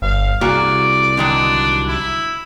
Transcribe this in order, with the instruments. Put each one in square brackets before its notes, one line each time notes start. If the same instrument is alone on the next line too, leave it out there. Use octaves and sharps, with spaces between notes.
[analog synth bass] G1 [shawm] F5
[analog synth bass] C2 [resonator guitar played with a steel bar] A#3 F#4 G#4 [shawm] D5
[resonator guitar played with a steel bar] D3 D#3 F#3 [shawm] D4
[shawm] E4